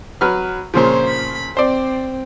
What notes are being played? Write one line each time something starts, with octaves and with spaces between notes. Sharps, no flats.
F#3 B4 F6
A#2 C#3 F3 C5 C#5
B5
C4 C5 D5